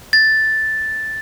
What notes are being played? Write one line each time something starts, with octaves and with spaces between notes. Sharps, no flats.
A6